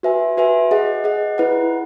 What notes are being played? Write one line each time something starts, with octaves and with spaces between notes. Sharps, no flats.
F#4 B4 E5 G#5
F#4 B4 E5 G#5
G#4 D#5 F#5
G#4 D#5 F#5
E4 B4 F#5